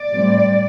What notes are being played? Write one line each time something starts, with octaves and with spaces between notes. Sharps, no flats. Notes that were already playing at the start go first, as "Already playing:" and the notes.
Already playing: D5
A2 G3 C4